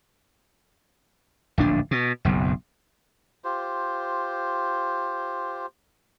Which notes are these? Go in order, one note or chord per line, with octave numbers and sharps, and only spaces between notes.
D1 A#1 D4
B2
F#1 B1
F4 G4 C5